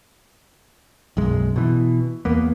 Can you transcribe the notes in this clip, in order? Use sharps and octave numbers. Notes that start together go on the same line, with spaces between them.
B1 F#2 G#3
B2 E3
E2 A#3 B3